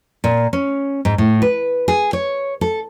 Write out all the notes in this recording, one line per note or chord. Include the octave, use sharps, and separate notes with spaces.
A#2
C#4
G#2
A2
B4
G#4
C#5
A4